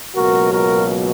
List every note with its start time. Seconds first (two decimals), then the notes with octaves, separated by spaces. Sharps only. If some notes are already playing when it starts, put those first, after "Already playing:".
0.16 C#2 B2 F#3 A#3 F#4 A#4
0.54 F#4 A#4